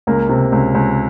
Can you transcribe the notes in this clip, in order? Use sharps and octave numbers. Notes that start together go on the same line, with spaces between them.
C#2 A#3
C3
C#2
C#2